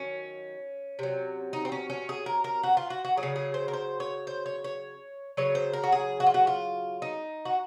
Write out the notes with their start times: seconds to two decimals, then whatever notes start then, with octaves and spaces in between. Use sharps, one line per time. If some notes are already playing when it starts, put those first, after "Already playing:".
Already playing: D#3 F#3 C#4
0.99 C3 F#3
1.53 D#4
1.65 C4
1.72 C#4
1.90 C#4
2.09 G#4
2.26 A#4
2.44 A#4
2.63 F#4
2.77 F4
2.90 F#4
3.05 F#4
3.17 F#3 G#4
3.23 C#3
3.36 G#4
3.54 C5
3.68 A#4
3.73 C5
4.00 C#5
4.27 C5
4.46 C#5
4.64 C#5
5.37 C#3 F#3 C#5
5.55 C5
5.73 A#4
5.84 F#4
5.92 G#4
6.20 F#4
6.27 F4
6.34 F#4
6.47 F4
7.02 D#4
7.45 F#4